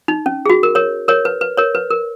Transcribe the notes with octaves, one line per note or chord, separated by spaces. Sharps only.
D#4
C#4
G#4
F#4
A#4
A#4 C#5
A#4 C#5
B4
B4
A#4 C#5
B4
A#4